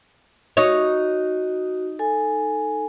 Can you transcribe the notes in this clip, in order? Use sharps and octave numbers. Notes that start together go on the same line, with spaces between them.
D#4 F#4 C#5
A4 G#5